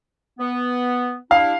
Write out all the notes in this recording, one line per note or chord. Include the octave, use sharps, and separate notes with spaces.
B3
G3 D4 E4 F5